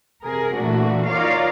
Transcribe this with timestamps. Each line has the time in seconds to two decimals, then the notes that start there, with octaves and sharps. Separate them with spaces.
0.24 C3 G#4 A#4
0.57 A#2 E3 A3 D4 F#4
1.09 D#4 F4 A#4 C#5 D5 F5